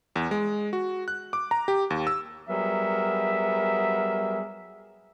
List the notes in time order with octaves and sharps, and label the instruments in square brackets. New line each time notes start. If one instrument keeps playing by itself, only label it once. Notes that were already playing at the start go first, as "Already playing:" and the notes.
[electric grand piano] E2
G#3
F#4
F#6
D6
A#5
G4
D#2
E6
[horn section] F#3 G3 B3 G#4 A#4 E5